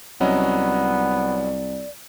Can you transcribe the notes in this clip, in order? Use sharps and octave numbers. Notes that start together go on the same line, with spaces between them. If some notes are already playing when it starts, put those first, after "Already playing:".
C2 F#3 B3 C#4 D5 D#5